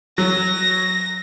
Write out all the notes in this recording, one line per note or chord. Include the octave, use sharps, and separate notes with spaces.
F#3 A#6